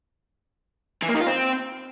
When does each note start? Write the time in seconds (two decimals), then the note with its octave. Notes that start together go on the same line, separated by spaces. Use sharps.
1.03 E3
1.09 A#3
1.15 D#3
1.21 F4
1.27 C4